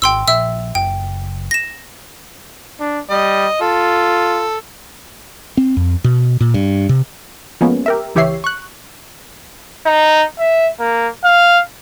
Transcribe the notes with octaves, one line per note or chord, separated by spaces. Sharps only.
G#1 G5 C6 E6
A#1 E5 E6
F#1 G5
A#6 E7
D4
G3 D#5
F4 A4
C4
F2
B2
A#2
G2
C3
F3 G#3 A#3 B3 C#4
G4 A#4 E5
C#2 E3 G4 C#5 E5 C7
C#6 F#6
D#4
E5
A#3
F5